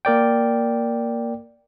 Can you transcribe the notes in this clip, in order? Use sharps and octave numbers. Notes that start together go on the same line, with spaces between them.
A#3 A#4 D5 G5